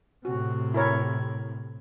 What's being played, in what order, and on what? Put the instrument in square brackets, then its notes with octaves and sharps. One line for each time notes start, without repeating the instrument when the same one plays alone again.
[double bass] A2 C3 [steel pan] F#4
[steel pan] E4 A#4 C#5